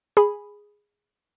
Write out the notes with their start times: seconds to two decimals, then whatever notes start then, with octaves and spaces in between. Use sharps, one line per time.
0.17 G#4 G#5 B5